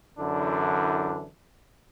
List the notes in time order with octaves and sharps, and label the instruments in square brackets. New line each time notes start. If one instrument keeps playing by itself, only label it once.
[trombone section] F#2 D3 E3 D4 E4